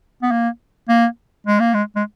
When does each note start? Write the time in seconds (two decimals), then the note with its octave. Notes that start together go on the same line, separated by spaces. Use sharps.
0.22 B3
0.32 A#3
0.89 A#3
1.47 G#3
1.60 A#3
1.74 G#3
1.96 G#3